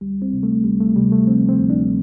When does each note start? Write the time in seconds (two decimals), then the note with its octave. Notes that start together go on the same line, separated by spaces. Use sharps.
0.01 D2 G3
0.22 C4
0.33 C3
0.43 A3
0.64 D2 G3
0.80 A3
0.96 C3 G3
1.12 A3
1.27 F3 C4
1.49 C4
1.59 D2
1.70 D4